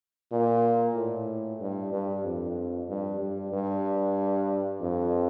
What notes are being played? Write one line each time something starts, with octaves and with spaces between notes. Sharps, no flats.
A#2
A2
G2
G2
F2
G2
G2
G2
F2